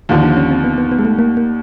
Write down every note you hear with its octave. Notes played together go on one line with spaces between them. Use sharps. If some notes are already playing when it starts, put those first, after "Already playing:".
D#2 D3 F3
D4
C#4
C4
B3
B3
B3
G#3
A3
A#3
A#3